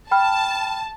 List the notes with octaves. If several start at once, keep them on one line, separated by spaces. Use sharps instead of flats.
G5 A5 B5 F6